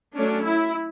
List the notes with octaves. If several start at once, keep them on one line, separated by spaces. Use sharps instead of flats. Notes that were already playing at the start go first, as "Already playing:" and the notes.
F#3 A3 C#4 D4
E4